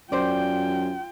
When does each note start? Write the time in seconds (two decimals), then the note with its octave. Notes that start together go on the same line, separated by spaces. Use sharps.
0.12 F#2 F4 C5 D5 G5